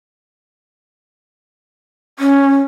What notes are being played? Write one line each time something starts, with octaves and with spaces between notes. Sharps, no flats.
C#4